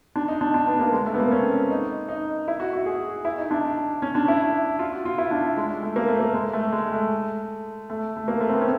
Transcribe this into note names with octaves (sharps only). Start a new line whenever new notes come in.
D4
D#4
D4
D4
B3
A#3
G#3
A3
B3
A#3
C4
C#4
D#4
D#4
E4
F#4
F#4
G#4
E4
D#4
D4
C#4
D4
E4
F4
F#4
F4
E4
D4
G#3
A3
A#3
A3
A#3
G#3
A3
G#3
A3
A3
A3
A#3
A3
C4
B3
C#4